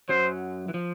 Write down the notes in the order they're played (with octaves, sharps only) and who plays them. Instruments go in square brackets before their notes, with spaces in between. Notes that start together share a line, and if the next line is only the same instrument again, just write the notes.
[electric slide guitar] F#2 F#3 [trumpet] C5
[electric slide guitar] E3
F3